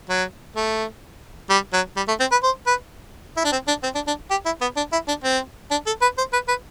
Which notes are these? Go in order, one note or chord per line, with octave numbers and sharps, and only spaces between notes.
F#3
A3
G3
F#3
G3
A3
C4
B4
C5
B4
E4
D4
C4
D4
C4
D4
D4
G4
E4
B3
D4
E4
D4
C4
D4
A4
B4
C5
B4
B4